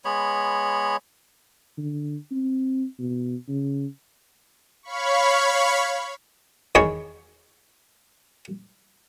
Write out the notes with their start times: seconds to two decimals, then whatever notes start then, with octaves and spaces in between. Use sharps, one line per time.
0.05 G#3 B3 C#5 B5
1.78 D3
2.31 C4
2.99 B2
3.49 C#3
4.83 C#5 F5 B5 C#6
6.75 E2 D#3 G#4 C#5